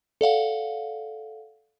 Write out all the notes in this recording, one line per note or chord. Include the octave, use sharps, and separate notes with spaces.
A4 D5 F5 F#5